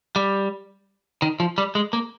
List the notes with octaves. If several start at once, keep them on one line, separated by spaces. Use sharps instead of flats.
G3
D#3
F3
G3
G#3
A#3